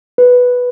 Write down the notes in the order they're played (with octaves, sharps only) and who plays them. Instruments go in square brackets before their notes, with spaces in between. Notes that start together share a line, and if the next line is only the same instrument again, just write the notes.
[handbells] B4